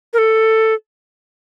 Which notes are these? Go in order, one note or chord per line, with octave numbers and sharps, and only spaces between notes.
A#4
A4